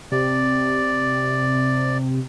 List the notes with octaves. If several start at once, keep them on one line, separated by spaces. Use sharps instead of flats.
C3 D5